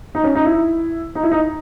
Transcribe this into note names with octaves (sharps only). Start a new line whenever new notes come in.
D#4
C#4
D#4
E4
D#4
E4
D#4